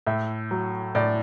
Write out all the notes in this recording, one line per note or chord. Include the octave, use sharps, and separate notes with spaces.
A2 E5
F#3
A2 D5